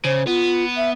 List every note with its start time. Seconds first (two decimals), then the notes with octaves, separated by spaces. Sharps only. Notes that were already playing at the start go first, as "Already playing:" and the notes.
0.04 C#3 C5
0.27 B3 F4
0.77 E5